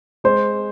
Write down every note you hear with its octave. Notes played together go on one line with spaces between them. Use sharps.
G#3 C5